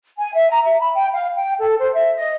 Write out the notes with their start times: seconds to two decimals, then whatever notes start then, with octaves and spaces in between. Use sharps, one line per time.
0.18 G#5
0.34 E5
0.50 A#5
0.65 E5
0.81 B5
0.95 G5
1.14 F5
1.36 G5
1.60 A4
1.80 C5
1.94 E5
2.17 D#5